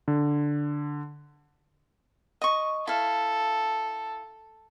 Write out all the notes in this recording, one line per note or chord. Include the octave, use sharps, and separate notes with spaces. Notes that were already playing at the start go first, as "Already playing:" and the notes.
D3
D#5 C#6
E4 A4 F5